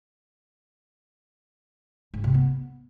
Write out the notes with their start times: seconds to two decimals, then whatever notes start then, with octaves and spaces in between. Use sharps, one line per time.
2.14 G#2
2.24 C3
2.34 B3